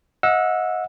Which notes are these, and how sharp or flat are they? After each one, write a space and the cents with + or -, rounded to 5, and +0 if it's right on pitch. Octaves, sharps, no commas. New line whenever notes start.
D#5 +25 F#5 -30 E6 +0